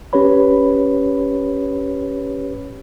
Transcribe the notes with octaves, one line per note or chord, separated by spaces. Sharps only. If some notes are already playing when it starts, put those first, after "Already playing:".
C#4 G4 B4 C#5 B5